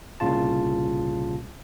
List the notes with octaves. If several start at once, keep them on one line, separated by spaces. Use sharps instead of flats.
C2 A#2 C#3 F4 A5